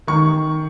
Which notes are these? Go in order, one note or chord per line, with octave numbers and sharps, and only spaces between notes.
D#3 C#6